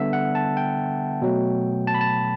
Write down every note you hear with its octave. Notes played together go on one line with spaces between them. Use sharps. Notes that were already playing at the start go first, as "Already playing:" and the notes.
Already playing: D3 G3 B3 E5
F#5
A5
G5
B2 F#3 A3
A5
B5
A5